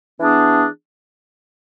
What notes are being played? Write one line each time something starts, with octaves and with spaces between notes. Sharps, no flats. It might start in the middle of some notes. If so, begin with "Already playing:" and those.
E3 B3 D4 G#4